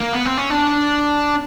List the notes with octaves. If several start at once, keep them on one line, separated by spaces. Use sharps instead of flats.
A#3
B3
C4
C#4
D4